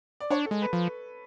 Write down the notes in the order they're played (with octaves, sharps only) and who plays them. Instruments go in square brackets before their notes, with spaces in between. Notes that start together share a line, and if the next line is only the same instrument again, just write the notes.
[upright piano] D5
[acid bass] D4 [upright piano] C#5
[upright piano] A4
[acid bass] G#3
[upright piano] B4
[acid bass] F3